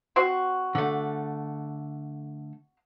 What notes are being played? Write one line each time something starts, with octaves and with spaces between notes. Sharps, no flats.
C4 F#4
D3 A3